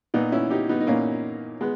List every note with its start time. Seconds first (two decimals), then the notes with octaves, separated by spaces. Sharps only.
0.14 A#2 B3 D#4
0.32 C#4 E4
0.50 D#4 G4
0.69 B3 D#4
0.80 D#4
0.87 A#2 A#3 C#4
1.61 G#3 B3